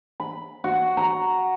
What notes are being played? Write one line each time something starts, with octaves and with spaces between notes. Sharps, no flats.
B5
F#4
A#5